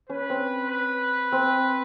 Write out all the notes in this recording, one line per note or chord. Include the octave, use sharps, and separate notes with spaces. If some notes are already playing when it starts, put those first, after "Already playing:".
C#4 B4
C4
B4
C4